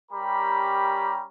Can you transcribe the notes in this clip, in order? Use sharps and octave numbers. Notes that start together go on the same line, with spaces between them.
G3 C#4 G4 A#4 A#5 B5